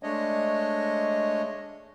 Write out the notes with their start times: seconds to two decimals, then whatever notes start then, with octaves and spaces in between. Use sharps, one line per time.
0.03 G#3 A3 D4 C#5 D#5